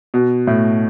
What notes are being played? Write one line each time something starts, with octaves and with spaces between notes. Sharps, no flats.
B2
A2